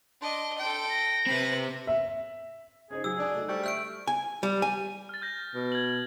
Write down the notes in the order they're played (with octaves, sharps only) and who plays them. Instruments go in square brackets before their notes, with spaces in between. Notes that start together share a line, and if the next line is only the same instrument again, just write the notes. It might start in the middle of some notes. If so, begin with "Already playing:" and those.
[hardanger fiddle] D4 D#5 [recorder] C6
[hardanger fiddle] A4 G5
[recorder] A#6
[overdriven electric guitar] C3 C4 [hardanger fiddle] B4 B5
[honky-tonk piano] E5
[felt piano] C#4 D#4 C5 [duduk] G#4
[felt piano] F#3 [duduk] G#4 [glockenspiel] E6
[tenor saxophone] D4 [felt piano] G#5 D#6
[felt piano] A3 D#4 F#4
[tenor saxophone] G3 [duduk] A4 [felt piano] C5 C#6 G6
[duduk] A3 [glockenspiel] F6 G6 D7 [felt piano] B6
[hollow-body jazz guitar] G#5
G3
G#5
[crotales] F6 A6
F6 G6 A#6
[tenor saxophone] B2
[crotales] G#6 F#7